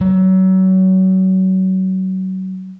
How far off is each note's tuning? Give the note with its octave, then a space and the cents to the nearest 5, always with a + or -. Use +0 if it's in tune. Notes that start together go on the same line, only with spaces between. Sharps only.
F#3 +30